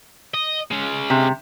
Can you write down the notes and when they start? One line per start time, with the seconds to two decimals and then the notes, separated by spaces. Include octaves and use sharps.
0.34 D#5
0.71 G#3 C#4
1.10 C3